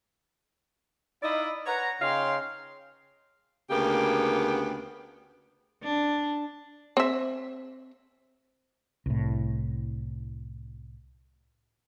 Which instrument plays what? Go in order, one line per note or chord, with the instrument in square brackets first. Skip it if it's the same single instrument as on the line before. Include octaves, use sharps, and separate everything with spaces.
[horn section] D#4 E4 D5 D#5 F5 B5
B4 C#5 F#5 A#5
C#3 D#4 C#5 F5 G5 C6
[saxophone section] D2 C#3 A#3 B3 G4
[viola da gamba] D4
[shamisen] C4 E5
[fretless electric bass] C2 A2